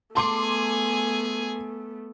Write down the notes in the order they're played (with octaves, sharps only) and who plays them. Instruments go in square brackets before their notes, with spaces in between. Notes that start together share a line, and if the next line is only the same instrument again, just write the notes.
[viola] A3 B3 [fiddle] G#4 G#5 [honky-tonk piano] A5 C6 D6